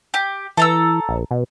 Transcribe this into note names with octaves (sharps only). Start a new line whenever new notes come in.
G4
E3 A4 A#5 E6
A#1
B2